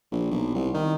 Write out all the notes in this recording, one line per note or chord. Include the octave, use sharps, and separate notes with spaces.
A#1
B1
C2
D#3